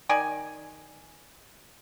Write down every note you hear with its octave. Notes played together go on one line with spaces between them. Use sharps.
D#3 D5 G#5